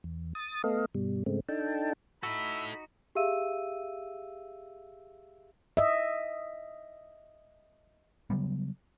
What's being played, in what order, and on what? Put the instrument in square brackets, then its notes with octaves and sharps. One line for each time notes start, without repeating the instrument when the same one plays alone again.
[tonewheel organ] E2
D#6 A6
A3 B3 A4 D#5 F5
G2 B2 G3
G#2 C#3 G#3 A3 C4
D4 D#4 A4 G5 A5
[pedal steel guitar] D#4 F#4 [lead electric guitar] E4 A4 [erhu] B5 [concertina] E6
[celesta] G4 G#4 E5 F5 E6 D#7
[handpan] D#5 E5
[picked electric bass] C#3 F#3 G3 B3